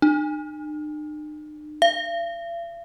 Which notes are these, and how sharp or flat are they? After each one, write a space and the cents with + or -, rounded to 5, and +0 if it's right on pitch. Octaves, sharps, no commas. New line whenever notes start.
D#4 -45
F5 -45